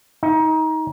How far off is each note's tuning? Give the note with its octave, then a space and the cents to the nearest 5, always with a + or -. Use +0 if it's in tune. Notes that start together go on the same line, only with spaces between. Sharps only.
D#4 +25